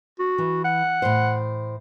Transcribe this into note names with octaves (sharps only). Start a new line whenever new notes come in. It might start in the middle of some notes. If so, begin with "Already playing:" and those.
F#4
E3
F#5
A2 C5